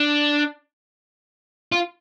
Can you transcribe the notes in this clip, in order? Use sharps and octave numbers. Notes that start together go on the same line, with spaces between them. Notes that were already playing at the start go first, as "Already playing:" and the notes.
Already playing: D4
F4